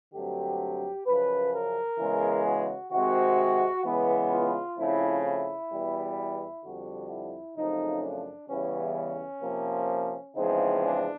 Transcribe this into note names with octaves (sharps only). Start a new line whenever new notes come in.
G2 D3 F#3 A3 C4 G4
F#2 C#3 F3 B4
A#4
C#3 E3 G#3 B3
F#4
C3 D#3 G#3 C4 F#4
C#3 E3 G#3 B3
F4
C#3 F3 A3 C4 E4
E4
E2 B2 G3
F2 D3 G3 F#4
E4
F#2 C#3 F3 A3 C4 D#4
D4
E2 C#3 E3 G3 B3 C#4
C#4
C3 F3 A#3
E2 C#3 F3 G#3 C4 D#4
D4